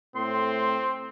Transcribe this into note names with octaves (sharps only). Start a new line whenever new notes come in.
A2 C4 C6